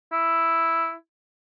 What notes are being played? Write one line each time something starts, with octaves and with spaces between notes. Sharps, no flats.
E4